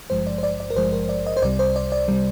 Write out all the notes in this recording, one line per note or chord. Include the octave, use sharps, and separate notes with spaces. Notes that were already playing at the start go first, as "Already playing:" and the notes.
G#1 G2 F3 G#3 C5
D5
C5
D5
D5
A#4
G#1 G2 F3 G#3 C5
A#4
D5
D#5
C5
C2 C3 G3 D5
C5
D5
D5
C3 G3